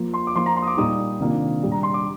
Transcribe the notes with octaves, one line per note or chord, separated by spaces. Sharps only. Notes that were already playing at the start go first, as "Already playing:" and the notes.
Already playing: F3 A#3 F4
C6
D6
F3 A#3 F4 C6
A#5
C6
D#6
D6
A#2 G3 A#3 D#4 D#6
C3 D#3 A#3 D4 F4
A#2 G3 D4
A#5
C6
D6